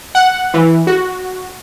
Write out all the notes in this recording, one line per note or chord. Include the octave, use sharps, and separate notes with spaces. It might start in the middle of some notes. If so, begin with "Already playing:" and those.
F#5
E3
F#4